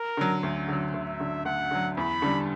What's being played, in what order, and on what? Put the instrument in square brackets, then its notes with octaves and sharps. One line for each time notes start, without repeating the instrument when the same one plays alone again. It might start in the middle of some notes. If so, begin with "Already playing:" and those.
Already playing: [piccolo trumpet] A#4
[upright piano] D3 F#3
D2
D3 F#3
[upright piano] D2 [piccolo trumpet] E5
[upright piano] D3 F#3
[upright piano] D2 [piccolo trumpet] F#5
[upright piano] D3 F#3
[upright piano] E2 [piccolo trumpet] B5
[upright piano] D3 G3